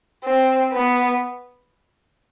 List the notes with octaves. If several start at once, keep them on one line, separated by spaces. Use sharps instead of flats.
C4
B3